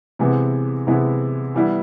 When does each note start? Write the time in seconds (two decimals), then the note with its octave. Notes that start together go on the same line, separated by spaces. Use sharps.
0.19 C3 E3 G#3 B3 E4
0.87 C3 E3 G#3 B3 E4
1.54 E3 G3 B3 E4